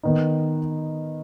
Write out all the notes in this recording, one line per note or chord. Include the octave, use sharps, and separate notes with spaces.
D#3 B3 D#4